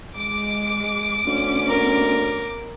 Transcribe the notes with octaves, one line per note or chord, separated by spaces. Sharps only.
G#3 D6
D2 B3 C#4
A#4